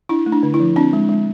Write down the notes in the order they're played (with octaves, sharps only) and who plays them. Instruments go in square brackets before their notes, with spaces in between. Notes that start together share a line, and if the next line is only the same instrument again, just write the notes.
[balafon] D4 E4
A3
D4
D3
E4
F3
C4 D4
G#3
G#3